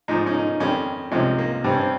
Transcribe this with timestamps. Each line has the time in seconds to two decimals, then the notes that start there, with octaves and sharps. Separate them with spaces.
0.08 G#2 F3 G#3 D#4
0.26 C#4
0.34 D#4
0.60 F2 D#3 G3 C#4
1.11 C2 C3 F3 G#3 C#4
1.38 A#3
1.64 G2 G3 C4
1.72 C#4
1.80 C4